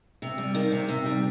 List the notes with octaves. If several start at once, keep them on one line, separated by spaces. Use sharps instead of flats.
C3
G3
D#3
C3
C3
G3